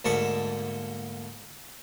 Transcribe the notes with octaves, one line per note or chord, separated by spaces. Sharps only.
D2 G#2 A#3 A5 C#6